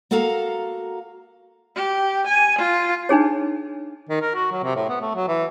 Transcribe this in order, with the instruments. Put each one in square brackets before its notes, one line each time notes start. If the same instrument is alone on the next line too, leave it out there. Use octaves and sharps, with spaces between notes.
[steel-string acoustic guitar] A#3 F#4 A4 F5 A#5
[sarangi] G4
G#5
F4
[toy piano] D4 D#4 G#4 C#5
[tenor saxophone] D#3
A#4
F#4
F#3
C3
A2
B3
A3
F#3
E3